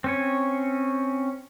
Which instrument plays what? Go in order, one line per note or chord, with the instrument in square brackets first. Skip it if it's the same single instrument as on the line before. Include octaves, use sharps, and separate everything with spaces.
[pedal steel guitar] C4 C#4 C#5